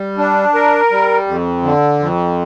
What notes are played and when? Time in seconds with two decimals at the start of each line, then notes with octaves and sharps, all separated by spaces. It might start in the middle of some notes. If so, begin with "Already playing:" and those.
Already playing: G3
0.18 D4
0.54 A#4
0.91 G3
1.27 F2
1.63 D3
1.99 F2